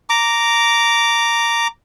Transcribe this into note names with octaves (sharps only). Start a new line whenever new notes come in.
A#5 D6